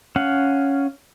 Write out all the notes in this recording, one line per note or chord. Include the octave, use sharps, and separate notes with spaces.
C#4 F5 F#5